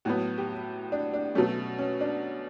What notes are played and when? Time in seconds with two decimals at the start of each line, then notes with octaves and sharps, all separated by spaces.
0.05 A2 F#3 B3 F#4
0.38 G4
0.92 D4
1.14 D4
1.35 B2 F#3 A3 C#4
1.78 C#4
2.01 D4